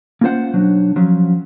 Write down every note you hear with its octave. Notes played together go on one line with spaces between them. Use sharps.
A#3 C#4 F4 A#4 C5 F#5
B1 F#3 D4
F3 F#3 C#4